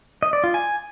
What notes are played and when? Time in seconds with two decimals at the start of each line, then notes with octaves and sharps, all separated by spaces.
0.23 D#5
0.33 D5
0.44 F4
0.54 G#5